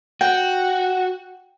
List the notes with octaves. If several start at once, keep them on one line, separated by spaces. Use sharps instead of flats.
F#4 F#5 G5